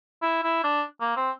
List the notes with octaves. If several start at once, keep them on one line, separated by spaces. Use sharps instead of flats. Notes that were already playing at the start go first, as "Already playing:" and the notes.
E4
E4
D4
A#3
C4